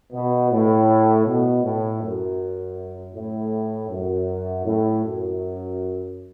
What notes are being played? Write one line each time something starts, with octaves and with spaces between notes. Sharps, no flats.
B2
A2
B2
A2
F#2
A2
F#2
A2
F#2